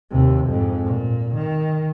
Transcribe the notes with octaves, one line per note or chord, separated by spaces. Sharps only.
D#2 C3
F2 G#2
A#2
D#3